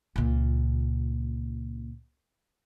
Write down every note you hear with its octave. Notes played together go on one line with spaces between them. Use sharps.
C#2 A#2